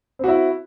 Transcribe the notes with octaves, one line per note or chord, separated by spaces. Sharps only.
C4 E4 F#4